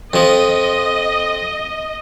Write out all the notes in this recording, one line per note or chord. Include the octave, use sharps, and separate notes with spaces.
F2 F3 D#5